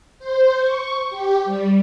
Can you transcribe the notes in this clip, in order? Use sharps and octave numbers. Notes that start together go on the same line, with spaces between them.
C5
C#6
G4
G3